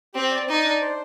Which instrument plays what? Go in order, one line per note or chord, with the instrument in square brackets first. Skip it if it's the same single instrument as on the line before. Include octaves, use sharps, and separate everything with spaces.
[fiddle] C4 [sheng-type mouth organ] G4
[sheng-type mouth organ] D5
[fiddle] D#4 [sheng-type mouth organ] D5
[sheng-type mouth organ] D4
C5